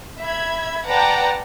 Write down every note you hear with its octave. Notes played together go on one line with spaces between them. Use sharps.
E5 B5 G#6
B4 D5 F#5 G5 A5 A#5